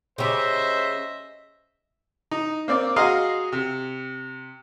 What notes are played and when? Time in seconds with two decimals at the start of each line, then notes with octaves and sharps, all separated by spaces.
0.18 C#3 G4 C5 D#5 E5
2.31 D#4
2.68 A#3 C4 D5
2.96 F#4 G#4 D#5 F5 A#5 C6
3.52 C3